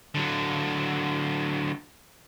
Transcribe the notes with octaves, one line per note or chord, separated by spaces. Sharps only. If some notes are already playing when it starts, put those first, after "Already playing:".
D3 F#3